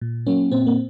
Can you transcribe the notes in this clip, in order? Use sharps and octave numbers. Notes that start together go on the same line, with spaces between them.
A#2
F#3 A#3 C#4
A#2 C4
A#3